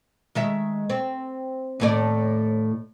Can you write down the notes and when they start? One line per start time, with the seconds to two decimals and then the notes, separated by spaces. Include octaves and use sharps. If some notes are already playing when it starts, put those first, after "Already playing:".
0.35 D#3 G#3 E5
0.90 C4
1.80 D#2 A2 D5